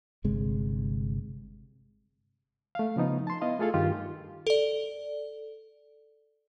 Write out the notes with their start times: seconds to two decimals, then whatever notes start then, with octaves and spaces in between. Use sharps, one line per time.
0.24 G1 C3 G#3
2.75 A3 F5
2.96 C#3 F3 B3 D#4
3.27 A5 C6
3.42 B3 E4 D#5 F5
3.59 A3 F4 G#4 A4 F5
3.74 G2 D#3 F4 G4
4.47 A4 D5